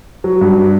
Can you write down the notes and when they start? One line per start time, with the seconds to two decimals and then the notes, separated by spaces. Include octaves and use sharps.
0.24 F#3
0.41 G2
0.57 D4